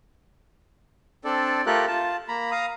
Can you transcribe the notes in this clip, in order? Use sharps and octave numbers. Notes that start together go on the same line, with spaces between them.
C4 D4 A4 D5
A3 F4 G4 A4 A#4 F#6
F4 A5
A#3 A#5 B5
F5 A#5 D#6